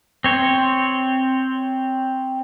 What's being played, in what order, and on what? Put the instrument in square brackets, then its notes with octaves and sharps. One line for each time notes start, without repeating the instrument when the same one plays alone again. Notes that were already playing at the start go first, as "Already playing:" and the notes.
[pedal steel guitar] C4 C#5